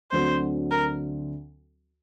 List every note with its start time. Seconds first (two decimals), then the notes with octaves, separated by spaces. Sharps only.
0.11 D2 D3 F#3 C4 C5
0.71 A#4